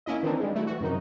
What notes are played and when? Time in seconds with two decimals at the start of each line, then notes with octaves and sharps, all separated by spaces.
0.06 A#3 C#4 E4 D#5
0.23 D#3 E3 C4 D4 D#4
0.40 G3 G#3
0.55 A3 E4 F#4
0.67 E3 F#4
0.81 F#2 C3 D#3 D#4